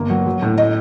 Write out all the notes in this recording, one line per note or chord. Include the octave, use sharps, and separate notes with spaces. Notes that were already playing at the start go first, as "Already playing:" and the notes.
Already playing: G1 A#3
F#3
F#3
A2
D#5